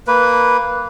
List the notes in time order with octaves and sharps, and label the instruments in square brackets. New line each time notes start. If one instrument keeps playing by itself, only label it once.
[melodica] A#3 B4